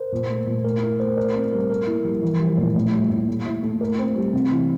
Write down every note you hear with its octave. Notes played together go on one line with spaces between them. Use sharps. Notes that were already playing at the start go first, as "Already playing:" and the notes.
Already playing: A#4 C5
A#2
A3
A#2
A3 A#4
E4 A#4
A3 C5
A#4 D5
C4 A#4
G3 A#4
A4 A#4
A#3 E4
F3 G3
E3 E4
F3 G3
A#2 A3
A2 A3
G3
A2
A3 A#3
E4
A3
A#4
C4
G3
C3 C4
E3